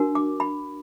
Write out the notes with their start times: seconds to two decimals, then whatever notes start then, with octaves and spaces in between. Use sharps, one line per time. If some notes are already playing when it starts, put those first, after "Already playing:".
Already playing: D4 F#4 A#4
0.15 D6
0.40 B5